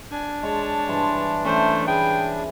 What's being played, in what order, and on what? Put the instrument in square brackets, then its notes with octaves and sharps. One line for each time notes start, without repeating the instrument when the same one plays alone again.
[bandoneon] D4 [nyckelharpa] G#5
[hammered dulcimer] G#3 [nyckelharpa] C#5 A5
[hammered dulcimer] G2 E3 C6
[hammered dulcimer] E3 C#4 [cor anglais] A3 [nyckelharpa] C5
[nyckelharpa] G#4 [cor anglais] G5 [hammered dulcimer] B5